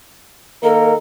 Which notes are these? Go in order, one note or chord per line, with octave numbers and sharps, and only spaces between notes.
D#3 A#3 A4 A#4